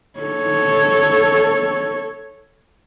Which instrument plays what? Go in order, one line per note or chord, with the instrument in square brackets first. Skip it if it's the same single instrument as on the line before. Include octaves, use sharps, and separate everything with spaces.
[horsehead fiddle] A4 C#5